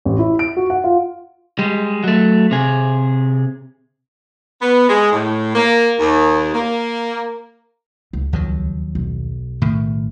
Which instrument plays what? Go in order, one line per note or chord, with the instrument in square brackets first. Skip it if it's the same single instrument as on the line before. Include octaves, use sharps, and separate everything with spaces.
[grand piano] A1
E4
D7
F#4
F#5
F4
[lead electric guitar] G3 G#3
F#3 A3
C3 G#4
[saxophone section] B3
G#3
A2
A#3
D#2
A#3
[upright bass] C#2
[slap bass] D#2 F3 F#3
[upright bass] B1
[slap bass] A2 D#3